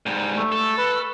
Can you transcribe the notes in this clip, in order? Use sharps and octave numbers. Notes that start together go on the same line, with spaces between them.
G#2 G3
A3
A4
B4